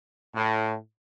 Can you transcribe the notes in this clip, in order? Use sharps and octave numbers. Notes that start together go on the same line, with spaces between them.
A2